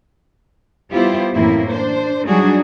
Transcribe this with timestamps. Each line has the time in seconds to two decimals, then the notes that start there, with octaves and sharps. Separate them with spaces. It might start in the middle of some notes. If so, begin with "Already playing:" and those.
0.92 G3 B3 E4 F4 G4 C5
1.34 F#2 A2 E3 A#3 C4 E4
1.71 D4 C5
2.26 F#3 G3 D4 D#4 F#4 G#4